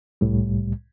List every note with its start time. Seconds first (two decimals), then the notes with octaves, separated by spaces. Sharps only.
0.21 C2 A2 G3